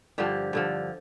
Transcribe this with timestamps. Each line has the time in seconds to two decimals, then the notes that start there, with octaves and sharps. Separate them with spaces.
0.18 G2 D3 F3 G4
0.53 G2 D3 F3